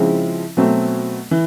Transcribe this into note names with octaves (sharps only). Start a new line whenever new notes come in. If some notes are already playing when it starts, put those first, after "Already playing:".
Already playing: C#3 F3 G#3 C4 E4
B2 F#3 A3 C4
E3